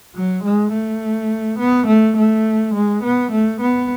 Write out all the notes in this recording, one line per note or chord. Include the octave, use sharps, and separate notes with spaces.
F#3
G#3
A3
B3
A3
A3
G#3
B3
A3
B3